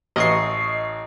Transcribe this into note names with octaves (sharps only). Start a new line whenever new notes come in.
A1 D#5 C#6 C7